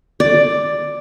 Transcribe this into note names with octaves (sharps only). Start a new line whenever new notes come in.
D5